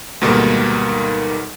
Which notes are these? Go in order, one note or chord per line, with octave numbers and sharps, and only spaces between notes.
D2 G#2 B2 D#3 G3 A#3